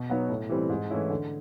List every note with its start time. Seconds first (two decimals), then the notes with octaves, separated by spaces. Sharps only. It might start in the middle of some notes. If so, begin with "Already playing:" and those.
Already playing: B2
0.09 F#3 B3 D#4
0.29 A2
0.49 E3 G3 C4
0.69 G#2
0.90 E3 A3 C#4 E4
1.10 D3